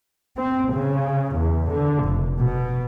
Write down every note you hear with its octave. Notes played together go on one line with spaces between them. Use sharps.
C4
C#3
E2
D3
F1
B2